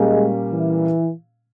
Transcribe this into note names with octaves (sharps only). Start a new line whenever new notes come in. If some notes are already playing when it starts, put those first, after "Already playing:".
Already playing: A#2 G3 G#3 A#3 C#4
E3